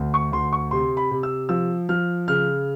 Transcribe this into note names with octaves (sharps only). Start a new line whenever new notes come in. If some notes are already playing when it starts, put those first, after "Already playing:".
Already playing: D2
C#6
D2 C6
C#6
C3 C6
B5
C3
E6
F3 E6
F3 F6
C#3 F6